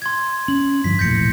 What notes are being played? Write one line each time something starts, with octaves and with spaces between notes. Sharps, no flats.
C6 G#6
C#4 F#7
G2 D3 F3 B6
E1 A#1 A2 G6 A#6 C#7